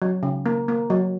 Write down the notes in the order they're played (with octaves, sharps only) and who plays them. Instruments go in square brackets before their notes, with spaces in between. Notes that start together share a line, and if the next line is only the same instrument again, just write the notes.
[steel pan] F#3
C#3
A#3
A#3
F#3